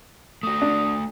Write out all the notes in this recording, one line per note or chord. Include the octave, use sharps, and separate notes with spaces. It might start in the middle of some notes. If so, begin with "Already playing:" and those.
A3 F#4 D#6
D4